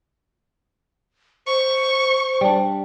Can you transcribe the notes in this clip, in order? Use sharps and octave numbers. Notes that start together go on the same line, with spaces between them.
C5 C#6
G3 D4